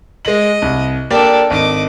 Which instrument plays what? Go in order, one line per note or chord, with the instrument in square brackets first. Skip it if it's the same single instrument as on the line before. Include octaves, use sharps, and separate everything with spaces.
[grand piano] G#3 F#7 [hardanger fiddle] D#5
[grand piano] C2
[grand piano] A#3 G4 D5 [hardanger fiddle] D4 A4
[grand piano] G#1 [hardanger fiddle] D#5 D6